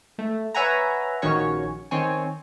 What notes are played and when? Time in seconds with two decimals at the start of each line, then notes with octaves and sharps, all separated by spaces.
0.18 A3
0.55 B4 C#5 E5 F#5 G#5 A#5
1.22 A#1 D#3 C#4 F#4 C#5 C#6
1.91 D#3 C4 C#5 G#5